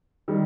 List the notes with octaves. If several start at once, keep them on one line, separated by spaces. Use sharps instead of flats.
D#3 G3